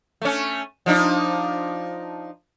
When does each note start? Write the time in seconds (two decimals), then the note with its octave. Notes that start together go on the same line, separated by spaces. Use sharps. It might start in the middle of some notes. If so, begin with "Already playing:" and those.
0.22 A3 C#4
0.86 F3 D4 D#4